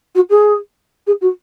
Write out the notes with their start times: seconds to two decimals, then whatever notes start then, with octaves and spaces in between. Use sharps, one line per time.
0.15 F#4
0.30 G#4
1.07 G#4
1.21 F#4